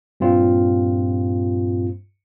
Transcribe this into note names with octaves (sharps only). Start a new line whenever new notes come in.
G2 A#2 C4 F4